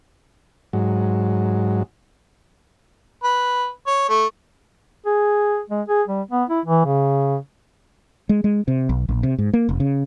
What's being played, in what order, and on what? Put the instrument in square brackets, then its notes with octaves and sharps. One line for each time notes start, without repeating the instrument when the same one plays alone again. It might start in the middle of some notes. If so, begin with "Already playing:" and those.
[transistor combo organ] G#2 F#3
[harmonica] B4
C#5
A3
[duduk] G#4
G#3
G#4
G3
B3
E4
E3
C#3
[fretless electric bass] G#3
G#3
C3
B1
A#1
C3
G#2
A#3
F1
C#3